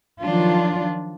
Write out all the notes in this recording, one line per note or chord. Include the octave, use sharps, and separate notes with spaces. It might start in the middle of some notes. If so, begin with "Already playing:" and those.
D#3 F3 F#3 D4 F4